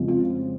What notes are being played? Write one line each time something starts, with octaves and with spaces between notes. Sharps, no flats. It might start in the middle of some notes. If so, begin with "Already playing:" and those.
Already playing: F2 C#3 F3 G#3 C4
F4